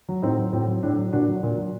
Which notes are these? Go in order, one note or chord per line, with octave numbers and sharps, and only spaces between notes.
F#3
A2 C4 D#4
F#3
A2 C4
F#3
A2 D4
F#3
A#2 D4 F#4
F#3
A#2
F#3